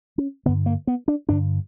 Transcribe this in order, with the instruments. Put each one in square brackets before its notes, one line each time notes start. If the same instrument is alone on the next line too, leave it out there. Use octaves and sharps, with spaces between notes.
[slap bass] C#4
G2 D3 B3
A#3
B3
D4
G2 D3 D4